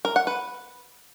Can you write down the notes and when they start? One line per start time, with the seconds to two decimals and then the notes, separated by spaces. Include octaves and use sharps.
0.05 A#4
0.16 F#5
0.27 B4